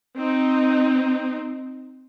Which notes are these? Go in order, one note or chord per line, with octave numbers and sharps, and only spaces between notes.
C4 D#4